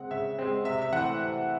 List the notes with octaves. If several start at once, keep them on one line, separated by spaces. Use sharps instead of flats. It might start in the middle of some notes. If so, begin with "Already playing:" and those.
Already playing: C#3 G#3 C4 F#5
C#3 E5
G#3 C4
C3 E5
E5
E3 A3 C4 F#5
C3